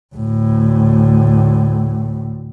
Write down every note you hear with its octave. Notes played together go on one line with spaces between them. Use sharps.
D2 A2